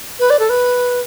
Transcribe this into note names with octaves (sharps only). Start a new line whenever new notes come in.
B4
D5
A4
B4